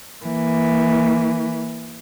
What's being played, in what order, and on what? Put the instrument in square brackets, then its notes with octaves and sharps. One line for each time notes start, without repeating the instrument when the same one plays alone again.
[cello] E3 A#3